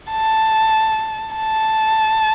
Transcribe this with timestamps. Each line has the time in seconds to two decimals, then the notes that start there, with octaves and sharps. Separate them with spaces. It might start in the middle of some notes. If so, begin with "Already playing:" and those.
0.11 A5
1.36 A5